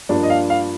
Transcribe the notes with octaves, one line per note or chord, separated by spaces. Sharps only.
G2 F3 A#3 D4 D5
D#5
F5
F5